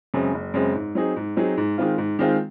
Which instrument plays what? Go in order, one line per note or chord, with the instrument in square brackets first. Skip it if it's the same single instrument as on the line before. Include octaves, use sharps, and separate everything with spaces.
[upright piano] F#2 C#3 G#3 C4
F#1
F#2 C#3 G#3 C4
G#2
F#3 C4 D#4 G#4
G#2
F#3 C4 D#4 G#4
G#2
D#3 G#3 C4 F4
G#2
D#3 G#3 C4 F4